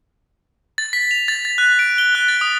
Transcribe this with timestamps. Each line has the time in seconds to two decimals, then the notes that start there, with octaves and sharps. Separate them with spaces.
0.78 A6
0.93 B6
1.11 F7
1.28 A6
1.45 A6
1.58 F#6
1.79 D7
1.98 G7
2.15 F#6
2.29 A6
2.41 D#6